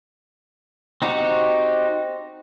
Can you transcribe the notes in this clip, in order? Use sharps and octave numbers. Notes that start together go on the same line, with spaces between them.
C4 D#4 F#4 G4